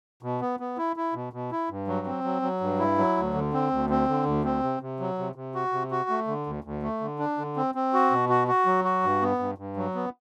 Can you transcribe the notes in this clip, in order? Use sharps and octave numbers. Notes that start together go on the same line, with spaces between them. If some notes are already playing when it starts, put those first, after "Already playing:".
B2
B3
B3
E4
E4
B2
B2
E4
G2
F#3
C4
F#3
F#3
G2
E4
F#3
D2
D3
C4
D2
C4
D3
D2
C4
C3
C3
F#3
C3
C3
F#4
C3
F#4
A3
D3
D2
D2
A3
D3
D4
D3
C4
C4
F#4
B2
F#4
F#4
F#3
F#4
G2
B3
G2
G2
F#3
B3